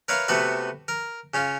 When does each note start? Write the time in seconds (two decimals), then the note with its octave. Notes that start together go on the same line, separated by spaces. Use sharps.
0.08 A#4 B4 C#5 E5 F5
0.28 C3 A3 B3 F#4 B4 E5
0.88 A#4
1.34 C#3 C#4 F4